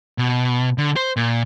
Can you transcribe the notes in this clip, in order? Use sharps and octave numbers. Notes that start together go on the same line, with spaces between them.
B2
D3
C5
A#2